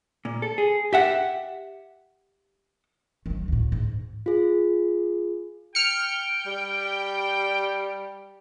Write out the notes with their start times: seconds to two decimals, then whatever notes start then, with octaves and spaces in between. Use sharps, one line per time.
0.25 A#2
0.42 A4
0.58 G#4
0.93 G4 E5 F#5
3.26 D#3 F#3
3.48 D2 A2
3.72 G#2
4.26 F4 G#4
5.75 G5 F6 C#7
6.47 G3